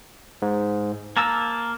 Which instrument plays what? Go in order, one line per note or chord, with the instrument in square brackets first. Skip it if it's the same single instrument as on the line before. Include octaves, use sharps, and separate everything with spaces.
[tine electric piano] G#2
[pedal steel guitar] A#3 A5 E6 [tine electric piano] A#5